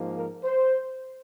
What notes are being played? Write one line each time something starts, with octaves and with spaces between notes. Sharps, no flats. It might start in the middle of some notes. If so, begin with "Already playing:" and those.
Already playing: G#2 F3 A#3
A#4
C5